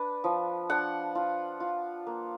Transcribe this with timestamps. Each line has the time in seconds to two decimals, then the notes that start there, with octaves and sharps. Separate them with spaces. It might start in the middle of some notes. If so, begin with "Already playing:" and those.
Already playing: D4 B4
0.24 F3
0.70 D4 F#5
1.15 F4
1.60 F4
2.07 A#3